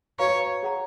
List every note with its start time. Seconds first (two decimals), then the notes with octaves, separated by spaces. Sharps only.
0.19 F#4 B4 C#5 F5 A#5 C#6
0.63 G#4 C#5 F#5 A#5